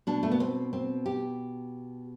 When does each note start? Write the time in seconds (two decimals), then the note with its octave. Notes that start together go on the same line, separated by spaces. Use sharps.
0.07 B2 D4
0.23 A3
0.32 B3
0.40 C4
0.73 C4
1.06 G4